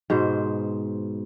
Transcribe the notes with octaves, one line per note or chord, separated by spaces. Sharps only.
G#2 B2 C5